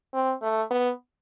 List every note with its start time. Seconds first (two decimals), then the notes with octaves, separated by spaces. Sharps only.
0.14 C4
0.42 A3
0.71 B3